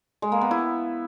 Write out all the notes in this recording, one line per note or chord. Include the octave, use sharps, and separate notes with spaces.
G#3
A#3
B3
E4